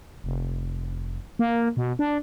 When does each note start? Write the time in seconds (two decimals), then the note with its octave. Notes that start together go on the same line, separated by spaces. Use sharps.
0.24 F1
1.39 A#3
1.77 B2
1.99 D4